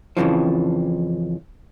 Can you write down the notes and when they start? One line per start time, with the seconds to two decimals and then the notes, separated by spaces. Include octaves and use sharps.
0.17 F2 A#2 C#3 E3 F3